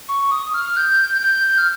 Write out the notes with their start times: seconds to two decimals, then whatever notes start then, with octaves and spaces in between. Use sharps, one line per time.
0.09 C#6
0.31 D#6
0.54 F6
0.77 G6
1.23 G6
1.58 F6